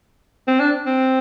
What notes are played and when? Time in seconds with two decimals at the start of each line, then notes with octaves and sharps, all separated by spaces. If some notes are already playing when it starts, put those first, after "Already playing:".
0.48 C4
0.60 D4
0.86 C4